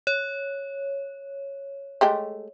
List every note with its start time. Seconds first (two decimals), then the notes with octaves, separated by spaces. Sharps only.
0.07 C#5
2.01 G#3 A3 G4